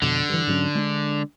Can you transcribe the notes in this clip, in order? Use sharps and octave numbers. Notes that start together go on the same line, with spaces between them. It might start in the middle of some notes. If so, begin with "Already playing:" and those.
F2 B2 D3
G2 E3
G#2 F#3 C#4
G#3 C#4 D4